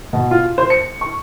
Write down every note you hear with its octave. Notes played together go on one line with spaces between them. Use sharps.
B2
F4
C5
C#7
C#6